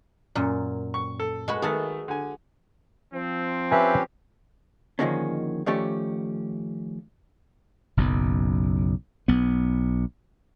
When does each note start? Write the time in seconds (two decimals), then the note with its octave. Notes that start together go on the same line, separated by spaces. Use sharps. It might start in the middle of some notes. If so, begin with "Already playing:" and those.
0.35 F#2 A#2
0.94 C#6
1.20 A4
1.48 G#3 F#4 B4
1.62 D#3 A3 G#4 F#5 A5
2.08 D3 G#5
3.13 F3 C4
3.71 C#4 G4 B4 E5 G#5
4.99 D3 D#3 F3 G#3 A#3 C#4
5.66 D#3 F3 A3 C#4 G4 D5
7.97 F#1 B1 F#2
9.28 B1 B3